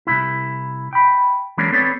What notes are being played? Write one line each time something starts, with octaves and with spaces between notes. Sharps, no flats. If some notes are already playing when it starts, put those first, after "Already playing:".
C2 G#2 E4
G5 B5
E3 F#3 G#3 A#3 C#4 D4
B3 C4 A4 B4 C#5 D5